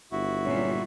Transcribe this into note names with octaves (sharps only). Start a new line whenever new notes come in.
G1 E4 F#4
A#2 F#3 G3 C#4